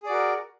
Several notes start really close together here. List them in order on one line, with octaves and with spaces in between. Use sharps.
G#4 D5 F#4 A#4